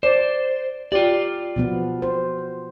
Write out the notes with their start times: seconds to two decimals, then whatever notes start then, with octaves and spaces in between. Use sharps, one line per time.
0.03 C5 D5
0.92 F4 G4 D5
1.56 B2 F3 B3
2.02 C5